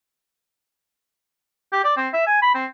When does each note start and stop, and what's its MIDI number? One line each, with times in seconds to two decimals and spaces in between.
1.73 1.81 67
1.84 1.93 74
1.97 2.08 60
2.13 2.23 76
2.27 2.41 80
2.42 2.52 83
2.55 2.65 60